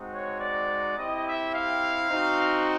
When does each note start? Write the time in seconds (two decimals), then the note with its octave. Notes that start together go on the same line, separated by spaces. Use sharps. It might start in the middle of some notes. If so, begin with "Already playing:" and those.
Already playing: G#3 C4 D#4 F#4
0.12 C#5
0.40 D5
0.97 C4 E4 G4 D#5
1.26 E5
1.54 F5
2.10 C4 D#4 F#4